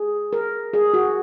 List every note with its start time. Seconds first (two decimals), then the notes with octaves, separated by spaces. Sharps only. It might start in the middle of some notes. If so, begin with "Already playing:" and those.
Already playing: G#4
0.33 A#4
0.74 G#4
0.94 F#4